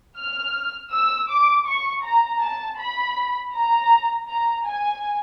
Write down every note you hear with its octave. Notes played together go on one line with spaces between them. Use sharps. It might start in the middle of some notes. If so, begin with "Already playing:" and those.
F6
E6
D6
C#6
A#5
A5
B5
A#5
A#5
G#5